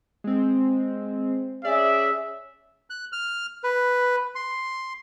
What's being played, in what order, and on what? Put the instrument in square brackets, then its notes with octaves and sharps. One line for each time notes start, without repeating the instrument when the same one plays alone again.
[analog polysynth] G#3 C4
[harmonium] C#4 G#4 [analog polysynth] D5 [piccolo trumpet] E5
[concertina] F#6
F6
B4
C6